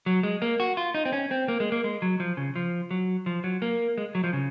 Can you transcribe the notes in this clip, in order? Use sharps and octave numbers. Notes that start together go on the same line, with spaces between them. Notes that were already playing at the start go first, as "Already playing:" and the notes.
F#3
G#3
A#3
F#4
F4
D#4
C4
C#4
C4
A#3
G#3
A#3
G#3
F#3
F3
C#3
F3
F#3
F3
F#3
A#3
G#3
F#3
F3
C#3